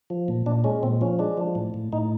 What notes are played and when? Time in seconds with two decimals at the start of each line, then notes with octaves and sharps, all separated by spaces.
0.10 F3
0.28 A#2
0.46 A#2 D4
0.64 G#3 C#4
0.83 A#2 C4
1.01 F3 C#4
1.19 G#3 D4
1.38 F3
1.55 A2
1.74 A2
1.93 A2 D#4